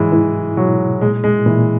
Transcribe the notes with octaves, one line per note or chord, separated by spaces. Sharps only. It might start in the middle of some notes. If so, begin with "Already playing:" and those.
Already playing: G#2 E3 F#3 G#3
E3 E4
B2 F#3
A#2 G#3
G#3
A#2 E3